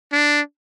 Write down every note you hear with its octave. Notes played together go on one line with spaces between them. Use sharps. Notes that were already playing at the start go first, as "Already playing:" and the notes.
D4